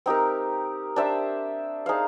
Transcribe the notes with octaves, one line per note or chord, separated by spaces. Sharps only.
C4 D#4 G4 A#4
D4 G4 C5 E5
D#4 G#4 C5 F5